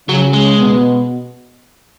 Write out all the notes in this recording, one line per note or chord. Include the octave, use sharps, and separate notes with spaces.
C#3 F#3 C#4
G#3
B2 B3